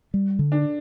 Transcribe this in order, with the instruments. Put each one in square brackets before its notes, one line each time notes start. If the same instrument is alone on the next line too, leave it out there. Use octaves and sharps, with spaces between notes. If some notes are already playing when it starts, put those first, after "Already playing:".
[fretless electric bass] G3
D3
[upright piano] D4